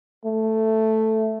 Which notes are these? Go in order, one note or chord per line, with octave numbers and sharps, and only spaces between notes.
A3